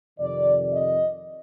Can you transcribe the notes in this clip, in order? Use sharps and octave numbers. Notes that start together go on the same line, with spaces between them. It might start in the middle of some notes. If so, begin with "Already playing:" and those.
F2 C3 D#3 D5
D#5